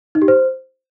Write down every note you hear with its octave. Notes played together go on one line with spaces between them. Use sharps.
D#4
G4
C5